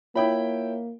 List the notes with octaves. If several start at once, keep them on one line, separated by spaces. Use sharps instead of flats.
A#3 E4 F4 C#5 E5 G5 B5